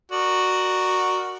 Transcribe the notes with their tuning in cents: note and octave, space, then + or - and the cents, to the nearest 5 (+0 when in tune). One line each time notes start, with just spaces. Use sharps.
F#4 +0 A#4 +0 D5 +25